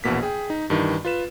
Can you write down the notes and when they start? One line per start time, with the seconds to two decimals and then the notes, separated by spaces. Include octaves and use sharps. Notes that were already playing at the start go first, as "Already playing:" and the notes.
0.04 A#1 E2 B2 A#3 B6
0.23 G#4 G5
0.50 D#4
0.70 G2 D#3 E3
1.05 F4 B4 E7